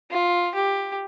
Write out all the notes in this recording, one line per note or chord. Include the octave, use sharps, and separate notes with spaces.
F4
G4